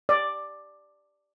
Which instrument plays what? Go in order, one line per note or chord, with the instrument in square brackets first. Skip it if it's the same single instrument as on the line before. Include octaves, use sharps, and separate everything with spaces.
[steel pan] D5